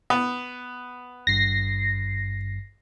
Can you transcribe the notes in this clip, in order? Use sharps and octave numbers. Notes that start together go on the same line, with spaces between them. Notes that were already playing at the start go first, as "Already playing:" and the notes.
B3
G#1 G2 A#6 C7